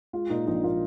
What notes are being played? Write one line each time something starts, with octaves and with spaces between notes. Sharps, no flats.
G#3 F4
A#2 D#4
A#1 D#4
A#2 F4